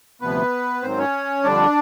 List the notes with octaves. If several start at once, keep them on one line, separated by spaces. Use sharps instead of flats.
D2 C3 F3 B3 B4
G#2 D#3 F#3 C4 C5
C#4 C#5
F2 D3 G3 D4 D5